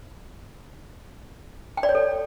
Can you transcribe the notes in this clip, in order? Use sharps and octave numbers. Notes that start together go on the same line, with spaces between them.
G5
D5
C#5
A4